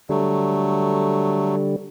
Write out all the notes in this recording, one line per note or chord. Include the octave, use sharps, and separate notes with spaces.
D3 F#3 G3 A3